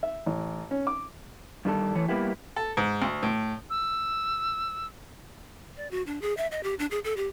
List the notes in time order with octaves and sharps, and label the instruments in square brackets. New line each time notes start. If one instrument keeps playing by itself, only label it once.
[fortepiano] E5
A1
C#4
D6
[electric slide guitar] G2 D#3 G3 A4
E3 A3 C#5
G3 A#3 B3 E4 G4
[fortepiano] A4
G#2
D2
A2
[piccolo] E6
[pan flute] D5
F#4
D4
G#4
E5
D#5
G4
D4
G#4
A4
G4